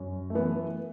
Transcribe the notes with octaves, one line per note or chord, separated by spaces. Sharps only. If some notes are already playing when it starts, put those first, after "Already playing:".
Already playing: F#2
A3
E3 B3